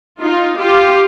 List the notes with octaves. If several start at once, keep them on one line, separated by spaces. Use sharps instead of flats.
D#4 F4
F4 G4